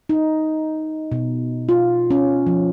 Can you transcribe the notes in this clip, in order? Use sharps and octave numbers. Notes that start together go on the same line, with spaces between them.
D#4
B2
F4
C#4
F3